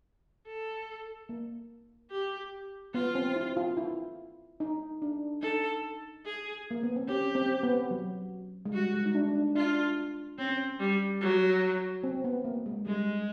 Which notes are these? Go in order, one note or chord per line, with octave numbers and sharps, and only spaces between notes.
A4
A#3
G4
B3 F4
C4
E4
F4
E4
D#4
D4
D#4 A4
G#4
A#3
B3
C4
C#4 G4
C4
B3
F#3
G#3
G3 F#4
G#3
D#4
D4
D4
D4 F4
C4 C#4
G3
F#3
C4
B3
A#3
G#3
G3 G#3